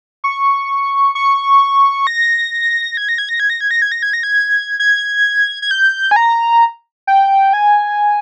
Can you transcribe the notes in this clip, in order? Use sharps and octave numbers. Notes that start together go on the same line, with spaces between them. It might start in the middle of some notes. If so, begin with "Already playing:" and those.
C#6
C#6
A#6
G#6
A#6
G#6
A#6
G#6
A#6
G#6
A#6
G#6
A#6
G#6
A#6
G#6
G#6
G#6
G6
G#5
A#5
G5
G#5